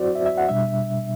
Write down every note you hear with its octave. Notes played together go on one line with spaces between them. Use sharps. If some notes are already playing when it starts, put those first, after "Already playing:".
Already playing: F#3 C4 E4 F#4 C5 D5
E5
E5
F#5
B2 G3 D4 E5